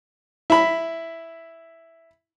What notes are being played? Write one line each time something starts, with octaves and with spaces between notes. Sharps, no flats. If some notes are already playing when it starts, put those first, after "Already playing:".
E4 B5